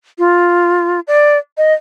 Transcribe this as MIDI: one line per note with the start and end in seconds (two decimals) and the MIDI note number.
0.19 1.00 65
1.08 1.38 74
1.58 1.74 75